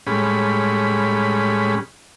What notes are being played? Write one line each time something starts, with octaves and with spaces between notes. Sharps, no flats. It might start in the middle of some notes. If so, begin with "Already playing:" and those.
A2 G3 G#3 C#4 B5